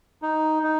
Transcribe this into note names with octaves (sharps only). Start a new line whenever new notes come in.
D#4
D#4